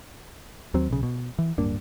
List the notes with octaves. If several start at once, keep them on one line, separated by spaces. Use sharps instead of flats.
D#2 F#3 C4
B1 C#3
B2
E3
D1 G2 A#3 D4